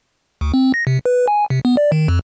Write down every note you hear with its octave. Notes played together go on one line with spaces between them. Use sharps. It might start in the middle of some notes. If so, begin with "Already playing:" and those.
D2
C4
A#6
C3
B4
G#5
C3
B3
D5
D#3
F2